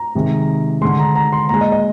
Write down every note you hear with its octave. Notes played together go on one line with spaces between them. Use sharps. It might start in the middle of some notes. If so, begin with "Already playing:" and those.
Already playing: A#5
C3 D#3 G#3
D3 G#3 C6
A#5
A#5
C6
A#2 G#3 A#5
D#5
D#5